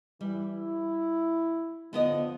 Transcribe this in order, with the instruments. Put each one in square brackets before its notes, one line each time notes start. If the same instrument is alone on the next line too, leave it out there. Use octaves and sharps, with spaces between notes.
[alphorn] E3 [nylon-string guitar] G3
[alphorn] E4
[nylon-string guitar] D3 B3 D#5 [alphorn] F3